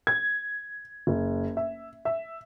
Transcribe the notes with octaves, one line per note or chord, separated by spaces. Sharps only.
G#6
F#1
E5
E5